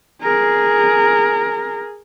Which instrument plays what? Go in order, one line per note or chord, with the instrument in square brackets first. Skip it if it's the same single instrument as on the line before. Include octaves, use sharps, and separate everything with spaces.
[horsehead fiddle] G#4 A#4